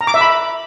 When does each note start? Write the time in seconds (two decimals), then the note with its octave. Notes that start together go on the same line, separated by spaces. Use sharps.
0.01 A#5
0.07 D6
0.14 E5
0.21 B5